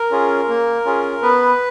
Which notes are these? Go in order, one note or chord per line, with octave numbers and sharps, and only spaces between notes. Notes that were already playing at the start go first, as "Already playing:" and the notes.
Already playing: A#4
C#4 F4 G#4
A#3
C#4 F4 G#4
B3 B4